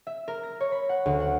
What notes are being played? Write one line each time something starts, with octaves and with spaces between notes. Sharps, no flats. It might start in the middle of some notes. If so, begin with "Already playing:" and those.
E5
A#4
A#6
C#5
B5
F#5
D2
F#5